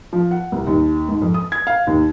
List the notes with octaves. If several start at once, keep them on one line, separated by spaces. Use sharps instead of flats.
F3
F#5
C2
D#2
G#2
F2
D#6
G#6
F5
D#2